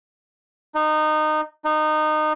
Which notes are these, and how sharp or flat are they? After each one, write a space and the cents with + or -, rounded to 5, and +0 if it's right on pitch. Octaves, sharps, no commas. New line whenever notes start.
D#4 -20
D#4 -20